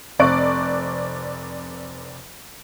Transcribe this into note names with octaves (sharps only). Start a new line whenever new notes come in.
F1 C4 D5 C#6 F#6 D7